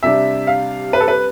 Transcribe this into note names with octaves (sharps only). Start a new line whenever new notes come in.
C3 G3 D4 E5
F5
B4
A4
B4